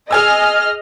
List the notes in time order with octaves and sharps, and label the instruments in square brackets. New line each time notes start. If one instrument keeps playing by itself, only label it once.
[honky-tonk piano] G#4 G#5 E6 [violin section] D#5 F6